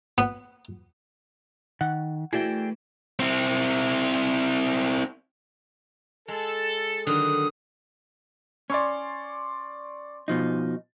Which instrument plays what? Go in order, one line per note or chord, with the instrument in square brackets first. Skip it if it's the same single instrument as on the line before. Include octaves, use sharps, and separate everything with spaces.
[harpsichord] B3
[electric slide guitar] D#3 [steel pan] F#5
[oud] E3 A3 [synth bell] E4 F#4 [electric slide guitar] G#4 D5 G5
[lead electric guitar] C4 E4
[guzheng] G#3 [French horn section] A4
[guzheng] D3 D#3 F#3 [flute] D#6
[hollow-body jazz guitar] C#4 [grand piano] D5 C6 C#6
[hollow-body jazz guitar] B2 F3 D#4